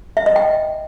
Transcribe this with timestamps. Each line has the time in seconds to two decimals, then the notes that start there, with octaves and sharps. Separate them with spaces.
0.17 E5
0.26 D#5
0.36 G5